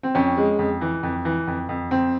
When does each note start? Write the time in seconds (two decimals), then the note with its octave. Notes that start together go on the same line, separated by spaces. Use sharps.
0.03 C4
0.15 F2 C#4
0.37 G#3
0.59 F2
0.81 E3
1.03 F2
1.25 E3
1.47 F2
1.69 F2
1.91 F2 C4